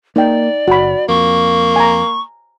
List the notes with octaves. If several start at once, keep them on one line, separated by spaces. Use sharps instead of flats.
A#3 D#4 D5 G5
F#1 F#4 B5
F2 A#3 C#6
G#5 A#5